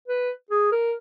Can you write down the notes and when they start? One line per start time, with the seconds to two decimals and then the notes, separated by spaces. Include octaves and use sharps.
0.08 B4
0.51 G#4
0.72 A#4